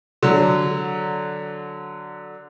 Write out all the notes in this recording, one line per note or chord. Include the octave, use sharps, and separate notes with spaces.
D3 F#3